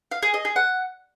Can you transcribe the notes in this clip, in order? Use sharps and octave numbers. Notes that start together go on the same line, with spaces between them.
F5
G#4
D#5
G#4
F#5